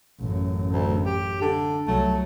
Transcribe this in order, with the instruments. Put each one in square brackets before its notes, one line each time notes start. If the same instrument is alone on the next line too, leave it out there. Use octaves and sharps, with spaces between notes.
[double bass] A1 F#2
[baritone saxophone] D2
G4
D3
[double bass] C2 F#3 [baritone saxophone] A3